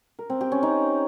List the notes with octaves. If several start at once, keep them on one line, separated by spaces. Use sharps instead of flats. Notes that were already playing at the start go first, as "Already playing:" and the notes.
A#4
C4
G4
C#4
D#4